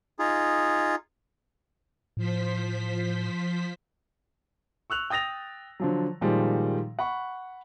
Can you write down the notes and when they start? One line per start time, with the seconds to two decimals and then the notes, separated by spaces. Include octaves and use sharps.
0.19 D#4 F4 G#4
2.17 A2 F3 C5 B6
4.90 C#6 E6 F#6 F7
5.10 G5 D#6 A6 A#6 F7
5.80 D3 F3 F#3
6.21 A#2 D#3 F3 G3 G#3
6.99 F#5 B5 C#6